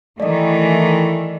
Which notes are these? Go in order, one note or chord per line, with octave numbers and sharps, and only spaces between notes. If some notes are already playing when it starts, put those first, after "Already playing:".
D#3 E3 A3 D5 D#5